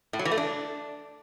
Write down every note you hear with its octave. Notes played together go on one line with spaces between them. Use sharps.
A2
F#3
E3
A3
D4